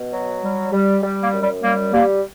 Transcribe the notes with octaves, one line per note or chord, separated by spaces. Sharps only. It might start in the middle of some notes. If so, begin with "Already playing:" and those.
Already playing: B2
F#3
G3
G3
G3
A#3
F#2
G3
G3 A#3
G3 A#3